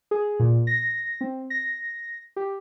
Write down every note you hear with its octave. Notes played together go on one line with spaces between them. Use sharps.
G#4
A#2
A#6
C4
A#6
G4